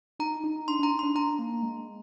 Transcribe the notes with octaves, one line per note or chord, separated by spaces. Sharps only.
D#4 A#5
D#4
D4 C6
D4 A#5
D#4
D4 C6
D4 A#5
A#3
G#3